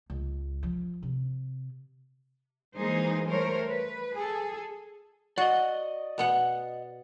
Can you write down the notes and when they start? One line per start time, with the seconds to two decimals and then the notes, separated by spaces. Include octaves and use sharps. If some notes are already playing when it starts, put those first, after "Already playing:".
0.10 C#2
0.63 F3
1.03 C3
2.75 E3 G#3 A#3 D#4 G#4 C5
3.28 G3 A3 A#4 C5 C#5
3.67 B4
4.16 G#4 A4
5.38 F#4 D5 D#5
6.18 B2 B3 F#5